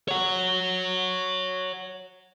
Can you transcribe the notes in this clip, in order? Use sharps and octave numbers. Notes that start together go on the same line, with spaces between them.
C#5 F#5